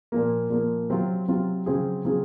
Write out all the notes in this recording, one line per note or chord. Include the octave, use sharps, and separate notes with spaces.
A#2 F3 A#3
A#2 F3 A#3
C3 F#3 C4 F4
C3 F#3 C4 F4
C#3 F#3 C4 F4 G#4
C#3 F#3 C4 F4 G#4